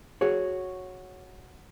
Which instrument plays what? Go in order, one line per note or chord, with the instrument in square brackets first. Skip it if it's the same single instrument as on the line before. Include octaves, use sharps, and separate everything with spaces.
[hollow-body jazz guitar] F#4 G#4 C#5